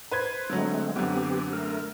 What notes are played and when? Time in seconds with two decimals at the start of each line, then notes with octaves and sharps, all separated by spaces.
0.11 B4 C5 G#6
0.50 D3 F#3 G#3 A3 C4
0.96 F#2 D3 B3 C4 G4
1.53 A3 A#4